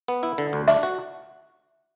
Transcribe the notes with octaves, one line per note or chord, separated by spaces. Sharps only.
B3
E4
D3
D2
D4 E5
F#4